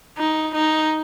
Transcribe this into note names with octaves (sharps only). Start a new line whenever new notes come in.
D#4
D#4